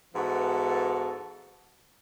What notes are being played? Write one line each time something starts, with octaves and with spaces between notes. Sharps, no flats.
G#2 E3 B3 F#4 A4